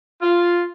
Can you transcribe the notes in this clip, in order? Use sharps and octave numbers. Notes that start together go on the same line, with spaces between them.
F4